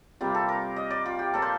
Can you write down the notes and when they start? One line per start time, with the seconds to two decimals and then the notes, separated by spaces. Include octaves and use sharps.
0.21 C3 G3 A#3 F4
0.35 A4
0.49 A#4
0.76 D#5
0.91 D5
1.06 F4
1.19 G4
1.34 A#2 F3 A#3 A4
1.42 C5